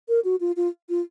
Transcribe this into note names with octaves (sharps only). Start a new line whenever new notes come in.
A#4
F#4
F4
F4
F4